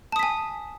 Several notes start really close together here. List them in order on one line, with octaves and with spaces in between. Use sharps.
A5 D#6 B6 G#5